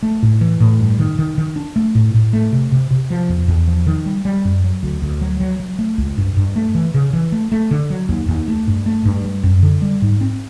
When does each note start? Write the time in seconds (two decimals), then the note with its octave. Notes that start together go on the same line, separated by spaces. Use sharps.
0.03 A3
0.23 A2
0.41 E3
0.60 A2
0.80 G2
0.99 D#3
1.19 D#3
1.38 D#3
1.56 D4
1.76 A3
1.95 A2
2.14 A2
2.33 A3
2.52 C3
2.72 C3
2.91 C3
3.10 F3
3.29 E2
3.48 E2
3.68 F3
3.87 D#3
4.06 G3
4.25 G3
4.45 F#2
4.64 F#3
4.83 D2
5.02 D2
5.21 F#3
5.40 F#3
5.60 F#3
5.79 A3
5.98 C#2
6.17 G2
6.37 G2
6.56 A3
6.75 E3
6.94 C#3
7.13 E3
7.32 A3
7.52 A3
7.71 D3
7.90 F#3
8.09 D#2
8.28 D#2
8.48 A3
8.67 G2
8.86 A3
9.05 G2
9.24 G3
9.43 F#2
9.63 D3
9.82 G3
10.02 G#2
10.21 C4